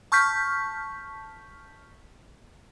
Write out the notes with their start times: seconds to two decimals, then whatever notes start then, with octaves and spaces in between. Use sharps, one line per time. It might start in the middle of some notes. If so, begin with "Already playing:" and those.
0.12 A5 C#6 F6 G6 B6